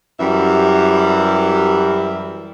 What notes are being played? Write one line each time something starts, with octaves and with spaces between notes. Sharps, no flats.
F#2 E3 G3 G4 E5